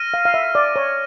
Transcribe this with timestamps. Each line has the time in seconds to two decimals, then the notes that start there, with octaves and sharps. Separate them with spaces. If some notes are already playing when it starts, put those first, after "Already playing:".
Already playing: F6 A#6 D#7
0.14 F5
0.25 F5
0.34 E5
0.55 D5
0.76 C#5